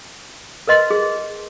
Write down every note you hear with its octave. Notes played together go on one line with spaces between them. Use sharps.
A#4 B4 D#5 C6
G#4